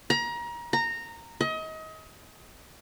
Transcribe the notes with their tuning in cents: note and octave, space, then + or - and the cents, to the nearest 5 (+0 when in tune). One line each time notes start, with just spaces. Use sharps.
A#5 +30
A#5 -15
D#5 +30